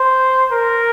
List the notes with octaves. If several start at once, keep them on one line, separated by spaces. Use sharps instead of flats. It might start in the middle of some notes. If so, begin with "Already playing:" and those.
Already playing: C5
A#4